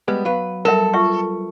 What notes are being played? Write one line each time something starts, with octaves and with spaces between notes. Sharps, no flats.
G3 G#3 B3
F#3 B3 B4 F5
G3 A4 A#4 E5
F4 E5 C#6